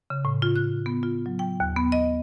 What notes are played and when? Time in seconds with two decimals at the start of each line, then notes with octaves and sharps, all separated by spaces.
0.10 C#3
0.25 A2
0.42 F4
0.56 F#6
0.86 B3
1.03 F4
1.26 F#3
1.39 G5
1.60 D#2
1.76 B3
1.92 D#5